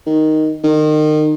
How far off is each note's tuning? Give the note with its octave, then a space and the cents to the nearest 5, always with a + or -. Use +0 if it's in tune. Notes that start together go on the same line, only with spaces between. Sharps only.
D#3 +0
D#3 -30